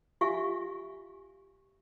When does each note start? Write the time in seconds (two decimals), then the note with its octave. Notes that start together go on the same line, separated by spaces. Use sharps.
0.21 F4 G4 E5 F5 G#5 C#6